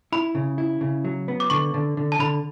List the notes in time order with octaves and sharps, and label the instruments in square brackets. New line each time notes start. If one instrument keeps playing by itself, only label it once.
[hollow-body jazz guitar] E4 [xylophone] B5
[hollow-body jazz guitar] C#3
E4
C#3
F#3
B3
[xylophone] D6
[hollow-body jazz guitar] D3 [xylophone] C#6
[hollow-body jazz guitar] D3
D3
[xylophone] A5
[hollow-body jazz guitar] D3 [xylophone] B5